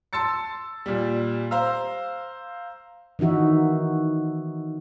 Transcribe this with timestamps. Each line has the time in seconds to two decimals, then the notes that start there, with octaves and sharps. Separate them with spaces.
0.13 A5 C6 E6 A6 C#7
0.86 A#2 G3
1.51 C5 F5 A#5 E6
3.19 D#3 E3 D#4 F#4 E5